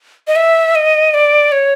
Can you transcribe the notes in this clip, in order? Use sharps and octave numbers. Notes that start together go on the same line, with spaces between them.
D#5
E5
D#5
D5
C#5